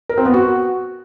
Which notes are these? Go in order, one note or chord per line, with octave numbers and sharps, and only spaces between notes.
A#4
C4
B3
F#4